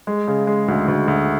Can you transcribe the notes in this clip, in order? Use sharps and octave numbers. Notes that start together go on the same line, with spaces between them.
G#3
C#3
G#3
D2
D2
D2